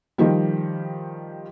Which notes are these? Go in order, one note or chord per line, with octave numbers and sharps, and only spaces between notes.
D#3 F3 G3